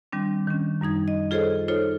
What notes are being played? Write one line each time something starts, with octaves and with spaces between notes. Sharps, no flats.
D#3 G3 C4 D4
D#3 C#4
F#2 G3 D#4 G#6
D#5
F4 G#4 A4 C5 C#5 D#5
D#4 F4 A4 C5 C#5